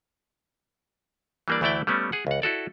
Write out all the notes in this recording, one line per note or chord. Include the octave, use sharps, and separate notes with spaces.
E3 G3 A#3 D4 D5
D2 E3 A3 E4 D5 G5
G3 A3 B3 C#4
G#4 F#5
C#2 F#5
E4 F#4 A4 D5